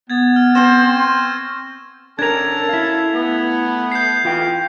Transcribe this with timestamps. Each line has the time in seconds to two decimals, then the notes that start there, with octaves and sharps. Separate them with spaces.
0.10 B3 G#6 A6
0.36 F6
0.55 C4 C5 F6 A#6 E7
0.96 C#6
2.19 C#4 D4 A4 A#4 A5 G#6 F7
2.69 E4 F5
3.13 A3 B3
3.92 G6 C7
4.25 E3 F4 F5 G5